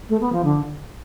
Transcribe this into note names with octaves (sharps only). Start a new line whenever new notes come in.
A3
B3
F3
D3